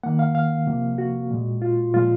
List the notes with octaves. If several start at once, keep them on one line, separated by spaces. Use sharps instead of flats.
D#3 A#3 F#5
F5
F5
C3 F3 A#3
F#4
A#2 G#3
F4
A#2 F3 G#3 F4